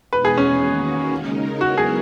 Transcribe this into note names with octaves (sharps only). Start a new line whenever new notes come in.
E2 B2 G#3 B3 D#4 B4
G#4
C#4
D#3 A#3 C#4 F#4
C#3 G#3 D#4 A#4
F#3 B3 E4 F#4 A#4
G#4